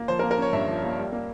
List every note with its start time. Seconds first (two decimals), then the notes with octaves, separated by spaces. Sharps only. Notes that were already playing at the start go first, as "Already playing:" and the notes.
Already playing: A#3
0.08 F3 C5
0.19 A#4
0.23 A#3
0.31 A#4
0.38 C#4 C#5
0.53 G2 E5
0.68 F3
0.84 A#3
0.98 G3
1.13 A#3